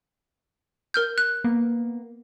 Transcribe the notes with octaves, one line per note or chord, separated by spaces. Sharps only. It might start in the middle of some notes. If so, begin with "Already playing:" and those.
A#4 F6 G6
F#6
A#3 B3